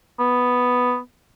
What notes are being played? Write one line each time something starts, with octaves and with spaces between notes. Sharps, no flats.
B3